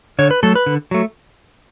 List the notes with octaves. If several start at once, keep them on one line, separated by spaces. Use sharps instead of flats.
D3 C#5
B4
F#3 A3 A4
B4
D3
F#3 A3